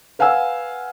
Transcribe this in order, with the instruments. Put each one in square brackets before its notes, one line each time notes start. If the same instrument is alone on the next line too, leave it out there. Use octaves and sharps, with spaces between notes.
[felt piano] B4 F5 F#5 G#5 E6